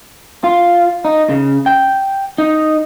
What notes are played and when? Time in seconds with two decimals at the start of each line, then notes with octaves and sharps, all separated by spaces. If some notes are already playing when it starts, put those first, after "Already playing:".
0.44 F4
1.05 D#4
1.29 C#3
1.66 G5
2.38 D#4